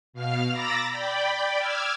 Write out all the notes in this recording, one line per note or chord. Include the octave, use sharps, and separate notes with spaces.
B2 F5 F6
A#5 B5 D6 E6 A6 A#6
D5 G5 B5
D6 E6 F6 G#6